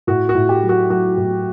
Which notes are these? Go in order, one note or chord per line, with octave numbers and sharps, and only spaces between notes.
A2 F#4
F#4
A2
G4
F#3
F#4
F#3 F#4
A2